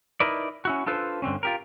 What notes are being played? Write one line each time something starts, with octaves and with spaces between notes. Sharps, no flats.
D#4 E4 A#4 B4 D5
C#4 E4 F#4
D4 F4 A4 B4 C5
G2 D3 C4 C#4
F4 G4 A#4